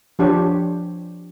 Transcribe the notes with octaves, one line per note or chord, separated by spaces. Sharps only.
F3 D4 G4 C5 C#5